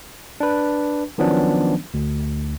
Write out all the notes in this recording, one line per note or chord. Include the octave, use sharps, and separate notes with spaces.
D4 B4
D#3 F3 F#3 B3 C#4 D4
D2